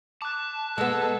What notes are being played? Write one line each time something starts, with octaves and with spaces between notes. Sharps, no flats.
A5 D6 F#6
G#3 B3 A4